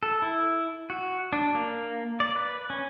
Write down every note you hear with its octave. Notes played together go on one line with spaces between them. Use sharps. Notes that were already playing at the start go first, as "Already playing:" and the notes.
A4
E4
F#4
D4
A#3
D5
B4
C#4